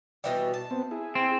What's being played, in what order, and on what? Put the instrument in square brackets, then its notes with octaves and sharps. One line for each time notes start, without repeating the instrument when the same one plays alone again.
[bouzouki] B2 E3 G3
A5
[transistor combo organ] B3 C4
E4 G#4
[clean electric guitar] C4